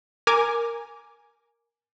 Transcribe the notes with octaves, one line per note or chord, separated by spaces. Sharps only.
A#4 G#5 D6